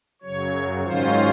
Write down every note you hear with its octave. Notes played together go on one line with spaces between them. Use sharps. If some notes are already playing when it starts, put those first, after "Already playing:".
F#2 C#3 F#3 C#5
G#2 D#3 F#3 C#4 F4 C5